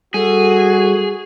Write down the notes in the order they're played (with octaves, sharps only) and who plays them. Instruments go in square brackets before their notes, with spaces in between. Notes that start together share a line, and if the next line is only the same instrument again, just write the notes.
[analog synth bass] G3 [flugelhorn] F#4 [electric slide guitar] G#4 [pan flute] A4